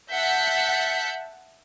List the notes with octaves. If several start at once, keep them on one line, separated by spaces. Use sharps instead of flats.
E5 F#5 A5 G6 B6 C#7